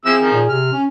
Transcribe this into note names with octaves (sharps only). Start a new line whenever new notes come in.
F3 C4 E4 G#4 E6
D#3 F3
A#2
C3 F6
C#4